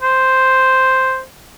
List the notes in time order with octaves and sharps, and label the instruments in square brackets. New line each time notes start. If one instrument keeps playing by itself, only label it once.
[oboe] C5